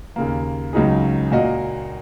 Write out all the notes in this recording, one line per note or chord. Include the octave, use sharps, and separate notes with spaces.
D#2 C#3 A#3
C#2 C#3 F#3 D#4 G#4
A#2 A#3 F#4 D#5